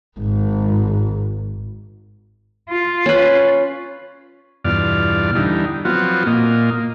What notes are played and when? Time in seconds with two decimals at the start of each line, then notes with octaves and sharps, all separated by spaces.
0.19 G#1
2.70 F4
3.06 C#4 B4
4.65 E2 G2 B2 F4 D5 F6
5.35 D3 E3 G3 D#4
5.85 F3 F#3 B3 C4 F4 F#4
6.27 A#2 A#3 F4 D#5